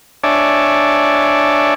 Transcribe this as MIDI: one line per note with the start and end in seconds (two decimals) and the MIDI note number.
0.24 1.74 62
0.24 1.74 73
0.24 1.74 74
0.24 1.74 76
0.24 1.74 80
0.24 1.74 81